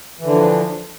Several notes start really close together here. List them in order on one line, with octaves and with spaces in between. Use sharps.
E3 D3 D4 F3